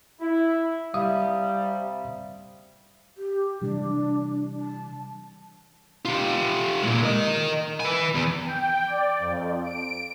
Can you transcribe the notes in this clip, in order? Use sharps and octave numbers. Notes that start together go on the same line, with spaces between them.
E4
C3 G3 E5 F5 D#6
G4
C3 E3 G3 D4
A5
F4 G4
A#2 G#3
A#4 D#5
B4 G#5
E2
G5
D5
F2
D7